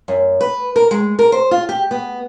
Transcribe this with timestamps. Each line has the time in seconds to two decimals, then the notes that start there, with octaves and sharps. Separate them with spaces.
0.08 F#2
0.41 B4
0.76 A#4
0.91 G#3
1.19 A#4
1.32 C5
1.51 F4
1.69 G4
1.91 B3